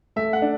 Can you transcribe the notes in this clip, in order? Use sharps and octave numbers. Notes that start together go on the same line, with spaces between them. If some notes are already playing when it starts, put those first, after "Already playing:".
A3 E5
F#5
D4